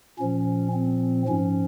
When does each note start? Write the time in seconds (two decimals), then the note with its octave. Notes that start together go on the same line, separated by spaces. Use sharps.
0.18 A#2 F3 C#4
0.73 C4
1.28 G#2 F3 C#4